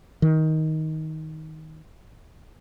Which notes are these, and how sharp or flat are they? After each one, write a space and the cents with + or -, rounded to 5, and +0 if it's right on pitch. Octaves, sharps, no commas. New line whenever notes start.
D#3 +15